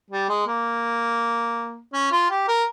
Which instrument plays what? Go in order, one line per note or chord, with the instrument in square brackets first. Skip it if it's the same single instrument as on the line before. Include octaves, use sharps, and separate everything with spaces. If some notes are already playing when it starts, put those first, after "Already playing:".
[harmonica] G3
G#3
A#3
C#4
F4
G4
A#4